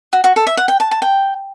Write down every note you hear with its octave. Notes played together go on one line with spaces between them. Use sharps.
F#4
F#4
A4
E5
F#5
G5
A5
A5
G5